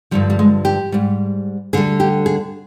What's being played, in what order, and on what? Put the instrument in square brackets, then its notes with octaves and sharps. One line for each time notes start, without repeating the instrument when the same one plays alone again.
[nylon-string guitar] G2 D3 F3 G3
G3
G#3
G4
G#2 G3
D2 D3 G3 G#4
G4
G#4